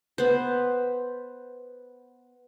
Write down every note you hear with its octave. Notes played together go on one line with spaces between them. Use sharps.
B3 C5